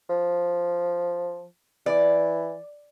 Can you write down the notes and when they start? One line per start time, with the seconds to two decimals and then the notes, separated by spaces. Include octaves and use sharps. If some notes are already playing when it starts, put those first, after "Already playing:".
0.09 F3
1.86 E3 D5